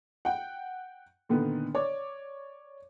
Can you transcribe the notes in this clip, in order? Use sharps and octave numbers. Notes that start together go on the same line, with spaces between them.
F#5 G5
A#2 D3 D#3 B3
C#5 D5 D6